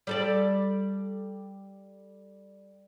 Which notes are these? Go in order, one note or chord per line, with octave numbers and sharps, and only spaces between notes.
G3 A4 D5